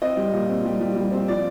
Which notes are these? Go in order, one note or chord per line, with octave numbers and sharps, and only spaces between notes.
C4 D#5
G3
A#2
C4
G3
G3
G3
C4
F3 D5